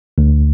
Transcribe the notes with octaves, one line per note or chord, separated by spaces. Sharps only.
D2